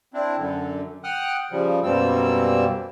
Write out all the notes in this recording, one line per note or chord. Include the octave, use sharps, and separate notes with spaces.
C4 D4 E4
F#2 D3
F#5 G5 D#6 F6 F#6
C#3 F3 G3
F#2 B2 G3 A#3 C4 E6